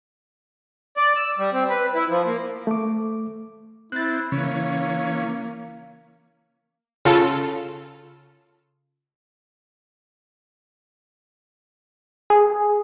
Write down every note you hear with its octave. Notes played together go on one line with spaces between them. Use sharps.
D5
E6
G3
C4
B4
E4
F3
A#3
A3 D6
C4 E4 F#6 A6
C#3 E3 A#3 C#4
C#3 F4 A4
G#4